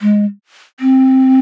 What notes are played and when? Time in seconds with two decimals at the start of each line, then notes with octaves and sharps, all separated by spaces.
0.01 G#3
0.80 C4